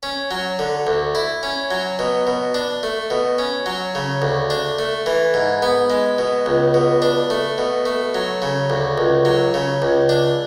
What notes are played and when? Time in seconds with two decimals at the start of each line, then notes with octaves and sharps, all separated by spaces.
0.03 C#4
0.31 F#3
0.59 D3
0.87 D2
1.15 E4
1.43 C#4
1.71 F#3
1.99 B2
2.27 B2
2.54 D4
2.83 A3
3.10 B2
3.38 C#4
3.66 F#3
3.95 C#3
4.22 D2
4.50 D4
4.79 A3
5.06 E3
5.34 G#2
5.62 B3
5.90 G#3
6.18 B2
6.46 C#2
6.74 B2
7.02 D4
7.30 A3
7.58 B2
7.86 A3
8.14 F#3
8.42 C#3
8.70 D2
8.98 C#2
9.25 F#3
9.54 C#3
9.82 C#2
10.09 D4